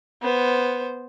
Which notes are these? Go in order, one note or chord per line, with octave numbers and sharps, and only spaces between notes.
B3 C5